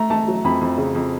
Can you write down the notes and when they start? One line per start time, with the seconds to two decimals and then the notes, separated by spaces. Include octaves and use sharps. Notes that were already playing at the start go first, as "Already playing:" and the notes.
Already playing: A3 A#5
0.10 A3 A5
0.28 F#3
0.44 F2 B5
0.61 F2
0.77 C#3
0.95 F2